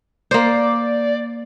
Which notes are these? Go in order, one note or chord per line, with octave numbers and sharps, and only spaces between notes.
A#3 C5 D5